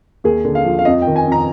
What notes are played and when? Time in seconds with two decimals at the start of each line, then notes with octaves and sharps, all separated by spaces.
0.24 D#2 G#4
0.45 D3
0.55 F5
0.65 F3
0.79 F5
0.85 F2 D#5
1.02 G5
1.07 D#3
1.16 G#5
1.27 F2
1.32 A#5